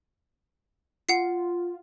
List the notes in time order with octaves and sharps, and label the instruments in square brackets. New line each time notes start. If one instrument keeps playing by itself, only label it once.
[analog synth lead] F4 [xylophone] F#5 C7